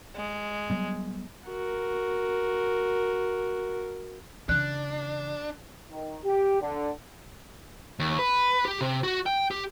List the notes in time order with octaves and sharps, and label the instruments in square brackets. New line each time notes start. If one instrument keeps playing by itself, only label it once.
[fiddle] G#3
[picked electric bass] F#3 G3 B3
[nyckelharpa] F#4 A#4
[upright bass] C#3 E3 [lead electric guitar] D4 [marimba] F#6
[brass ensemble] D#3
G4
D3
[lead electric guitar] D#2
B4
G4
C3
F#4
G5
G4